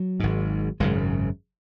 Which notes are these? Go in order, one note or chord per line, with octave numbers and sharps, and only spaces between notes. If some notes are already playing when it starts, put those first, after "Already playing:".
Already playing: F#3
G#1 G#2
G#1 F#2 C#3 G#3